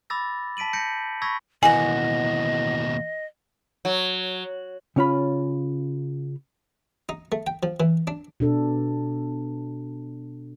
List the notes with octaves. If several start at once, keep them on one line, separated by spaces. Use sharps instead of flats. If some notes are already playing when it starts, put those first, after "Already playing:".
B5 D6 E6 A6 A#6
A5 B6 D7 D#7 F#7
G6 A#6 C#7 D7
B5 C#6 E6 G#6 A#6 B6
D#2 B2 E3 A#3 D#5 F#5 G#5
F#3
C#3 C#4 F4 B5
D#4
A3
G5
F3
E3
D4
B2 D4 A4